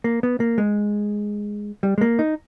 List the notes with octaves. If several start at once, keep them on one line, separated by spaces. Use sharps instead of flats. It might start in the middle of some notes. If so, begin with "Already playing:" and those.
A#3
B3
A#3
G#3
G3
G#3
A#3
D#4